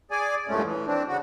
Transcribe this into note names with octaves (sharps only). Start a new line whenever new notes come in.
G#4 D5 G#5
E2 G2 A#2 G#3 A3 C#4
E3
C4 D4
C#3 F#4